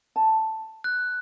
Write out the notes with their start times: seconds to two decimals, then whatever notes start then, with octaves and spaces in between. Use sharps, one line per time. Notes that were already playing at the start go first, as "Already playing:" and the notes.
0.16 A5
0.84 F#6